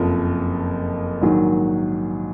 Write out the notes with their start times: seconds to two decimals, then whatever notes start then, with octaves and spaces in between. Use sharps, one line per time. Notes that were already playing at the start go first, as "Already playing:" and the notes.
Already playing: F#1 F2 F3 A#4
1.22 A#1 G#2 D#3 F#3